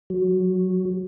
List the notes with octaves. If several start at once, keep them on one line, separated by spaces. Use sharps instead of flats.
F#3